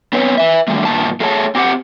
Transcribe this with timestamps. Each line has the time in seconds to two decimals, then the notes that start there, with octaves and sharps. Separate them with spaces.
0.13 B3 C4 B4 C#5
0.38 B4 E5
0.68 D3 D#3 G3 A3
0.85 G2 A#2 D#3 A5
1.20 A3 G#4 C#5 G5 A5
1.55 C4 G4 C5 F#5